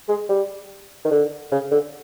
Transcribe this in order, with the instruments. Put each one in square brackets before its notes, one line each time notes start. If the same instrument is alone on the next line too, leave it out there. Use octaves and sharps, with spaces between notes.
[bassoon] G#3
G3
D#3
D3
C#3
D3